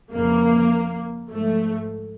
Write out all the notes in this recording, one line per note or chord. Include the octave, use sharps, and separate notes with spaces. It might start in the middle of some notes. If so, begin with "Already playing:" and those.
F2 C#3 E3 A#3
G#2 F3 A3